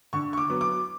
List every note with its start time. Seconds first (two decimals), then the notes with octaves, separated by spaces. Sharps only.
0.13 D3 C#6
0.33 C#6
0.38 D6
0.50 F#3 B3
0.61 D6